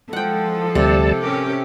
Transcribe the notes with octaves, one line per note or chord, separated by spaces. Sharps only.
F3 G#3 A4 F#5 G5
D2 C3 G3 A5
C#4 G4 A#4